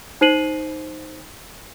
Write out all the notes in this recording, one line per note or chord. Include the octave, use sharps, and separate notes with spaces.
D#4 C5 C7 D#7 F#7